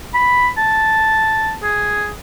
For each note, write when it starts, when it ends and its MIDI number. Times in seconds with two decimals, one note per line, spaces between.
0.14 0.47 83
0.58 1.53 81
1.63 2.09 68